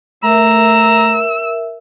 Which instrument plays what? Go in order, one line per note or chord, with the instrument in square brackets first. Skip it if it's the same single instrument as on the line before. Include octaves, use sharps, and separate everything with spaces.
[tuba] A3 [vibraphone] A#4 E5 [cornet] A#5 [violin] E6